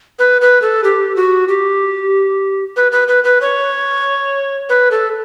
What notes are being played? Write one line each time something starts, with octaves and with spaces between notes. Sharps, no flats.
B4
B4
A4
G4
F#4
G4
B4
B4
B4
B4
C#5
B4
A4